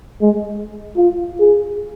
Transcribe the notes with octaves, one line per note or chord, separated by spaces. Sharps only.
G#3
F4
G#4